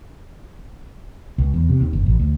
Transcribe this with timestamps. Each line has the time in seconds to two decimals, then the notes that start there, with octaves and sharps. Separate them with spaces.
1.38 C#2
1.54 E2
1.69 C3
1.81 D#2
1.93 F#1
2.06 A1
2.20 D2